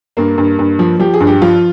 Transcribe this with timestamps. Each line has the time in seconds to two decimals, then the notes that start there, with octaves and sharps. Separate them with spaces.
0.17 G2 A#3
0.38 G2
0.59 G2
0.79 F3
0.99 F3 G4
1.14 G#4
1.20 G2
1.27 G4
1.42 F3 F4